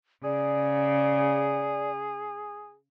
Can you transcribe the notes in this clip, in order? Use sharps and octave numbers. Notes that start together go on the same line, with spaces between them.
C#3 G#4 D5